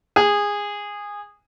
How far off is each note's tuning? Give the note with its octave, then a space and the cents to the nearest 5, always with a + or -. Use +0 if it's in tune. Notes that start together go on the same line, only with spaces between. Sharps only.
G#4 -20